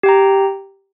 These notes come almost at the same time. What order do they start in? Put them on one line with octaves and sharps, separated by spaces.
G4 G5 A#5